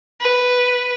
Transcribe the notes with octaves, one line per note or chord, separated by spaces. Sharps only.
B4